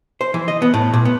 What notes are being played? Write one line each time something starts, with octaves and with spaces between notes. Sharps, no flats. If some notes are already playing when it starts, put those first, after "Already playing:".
C5
E3
D#5
B3
A2
A#2
B3